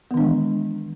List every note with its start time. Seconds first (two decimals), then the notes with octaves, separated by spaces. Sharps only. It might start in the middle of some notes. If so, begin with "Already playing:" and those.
0.11 B3
0.14 D#3
0.17 D4
0.21 G#3
0.24 E3